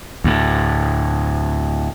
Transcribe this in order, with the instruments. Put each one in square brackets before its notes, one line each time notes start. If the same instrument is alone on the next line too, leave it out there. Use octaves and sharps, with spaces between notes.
[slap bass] D2 A2